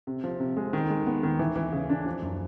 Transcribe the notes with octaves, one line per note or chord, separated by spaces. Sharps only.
C3
F3
C3
G#3
D#3
G#3
B3
D#3
E3
E3
C#3
D4
F3
F#2